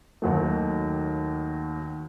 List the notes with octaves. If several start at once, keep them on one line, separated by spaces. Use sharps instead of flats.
D#2 D#3 F#3 A3